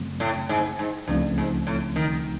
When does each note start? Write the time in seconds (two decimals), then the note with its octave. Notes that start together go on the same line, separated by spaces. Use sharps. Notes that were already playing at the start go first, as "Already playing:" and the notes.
Already playing: F#2 C#3 F#3 A3 C4
0.20 A2
0.49 G#2
0.79 G#2
1.08 C#2 G2 C#3 F3 A3 C4
1.38 G#2
1.67 A2
1.96 D#3